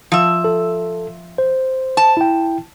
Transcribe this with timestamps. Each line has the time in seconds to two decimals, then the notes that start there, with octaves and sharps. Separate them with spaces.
0.12 F3 E5
0.44 A4
1.38 C5
1.97 A5
2.17 E4 G5